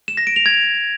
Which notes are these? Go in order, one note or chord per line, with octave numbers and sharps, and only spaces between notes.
E7
A#6
D7
F7
G#6